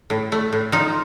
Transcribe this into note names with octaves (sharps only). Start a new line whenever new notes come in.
A2
A3
A2
F3 D#4